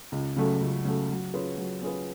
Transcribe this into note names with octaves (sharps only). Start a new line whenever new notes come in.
C#2
C#3 F#3 A3
C#2
C#3 F#3 A3
F#3
C#4 F4 G#4 B4
F#3
C#4 F4 G#4 B4